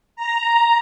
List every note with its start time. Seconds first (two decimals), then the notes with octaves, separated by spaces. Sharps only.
0.16 A#5